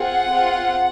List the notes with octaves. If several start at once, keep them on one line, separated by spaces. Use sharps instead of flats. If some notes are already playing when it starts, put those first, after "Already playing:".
Already playing: C4 F4 G#4 F#5
C4 F4 G#4